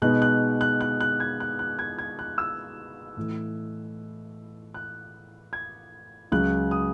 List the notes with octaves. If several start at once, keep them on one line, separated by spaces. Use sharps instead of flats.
B2 G#3 B3 D#4 F#6
F#6
F#6
F#6
F#6
G#6
F#6
F#6
G#6
G#6
F#6
E6
A2 E3 A3
F#6
G#6
C#2 C#3 F#3 F#6
D#6